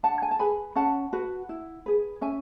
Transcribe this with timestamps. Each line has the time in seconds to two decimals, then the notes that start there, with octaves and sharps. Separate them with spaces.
0.03 D4 F#5 A5
0.22 G#5
0.31 A5
0.39 G#4 B4 G#5 B5
0.75 C#4 F#5 A5
1.13 F#4 B4
1.49 E4
1.86 G#4 B4
2.21 C#4 E5 G#5